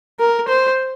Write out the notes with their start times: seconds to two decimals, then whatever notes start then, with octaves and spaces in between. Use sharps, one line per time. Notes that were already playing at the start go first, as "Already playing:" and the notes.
0.20 A#4
0.49 C5